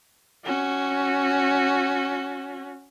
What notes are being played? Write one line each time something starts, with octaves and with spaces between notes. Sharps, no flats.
C#4 F#4